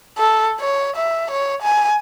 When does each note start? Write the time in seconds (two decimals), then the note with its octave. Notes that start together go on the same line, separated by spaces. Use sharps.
0.18 A4
0.60 C#5
0.96 E5
1.31 C#5
1.62 G#5